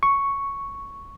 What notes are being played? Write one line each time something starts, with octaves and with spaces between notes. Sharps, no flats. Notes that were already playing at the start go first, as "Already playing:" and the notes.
C#6